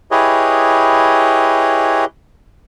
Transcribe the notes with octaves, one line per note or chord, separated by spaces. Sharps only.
E4 G4 G#4 B4 C#5 D#5